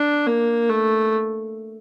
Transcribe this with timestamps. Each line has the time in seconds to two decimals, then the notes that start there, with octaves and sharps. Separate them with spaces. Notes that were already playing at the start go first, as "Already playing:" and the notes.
Already playing: D4
0.27 A#3
0.70 A3